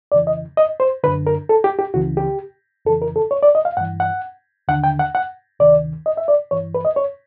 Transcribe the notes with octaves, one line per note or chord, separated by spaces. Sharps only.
F2 C#3 E3 D5
D#5
D#5
C5
F#2 D3 B4
A#4
A4
G4
G4
C#2 C#3 E3 F#4
G4
F2 C#3 E3 A4
A#4
A4
C#5
D5
D#5
F5
G2 E3 F#5
F#5
D#2 D3 F#5
G5
F#5
F#5
D2 C3 D#3 D5
D#5
E5
D5
G2 E3 C#5
B4
D#5
C#5